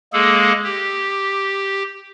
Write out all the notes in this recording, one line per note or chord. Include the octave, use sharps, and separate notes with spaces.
G#3 A#3 G#4 A4
G4